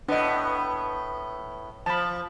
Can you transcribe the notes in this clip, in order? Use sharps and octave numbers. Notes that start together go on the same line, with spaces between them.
A2 B3 D4 D#5
F3 A5 B5